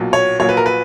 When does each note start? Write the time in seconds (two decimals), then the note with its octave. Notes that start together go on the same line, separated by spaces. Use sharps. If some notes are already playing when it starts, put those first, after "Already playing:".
Already playing: B1 A#2 F#3
0.13 C#5
0.39 A#1 A#2 F#3 C#5
0.49 B4
0.57 A#4
0.66 B4